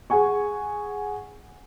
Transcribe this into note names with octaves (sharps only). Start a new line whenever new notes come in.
G#4 F#5 G#5 C#6